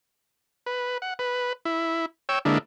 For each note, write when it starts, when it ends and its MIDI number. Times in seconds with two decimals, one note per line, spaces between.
0.66 0.98 71
1.02 1.14 78
1.19 1.53 71
1.65 2.06 64
2.29 2.39 73
2.29 2.39 79
2.29 2.39 88
2.45 2.58 50
2.45 2.58 56
2.45 2.58 58
2.45 2.58 62
2.45 2.58 64